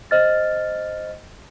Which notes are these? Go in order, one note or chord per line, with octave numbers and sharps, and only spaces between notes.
C5 D#5 F6 A6